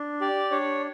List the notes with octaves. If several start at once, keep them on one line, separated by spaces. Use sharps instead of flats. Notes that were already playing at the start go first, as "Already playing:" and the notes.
Already playing: D4
G4 D5
D4 C#5